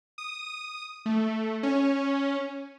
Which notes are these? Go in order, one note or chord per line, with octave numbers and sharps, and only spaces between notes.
D#6
A3
C#4